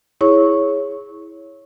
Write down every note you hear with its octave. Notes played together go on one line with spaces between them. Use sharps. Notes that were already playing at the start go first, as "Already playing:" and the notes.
E4 G#4 C#5 C#6